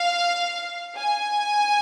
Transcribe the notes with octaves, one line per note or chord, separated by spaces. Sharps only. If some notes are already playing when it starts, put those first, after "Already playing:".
Already playing: F5
G#5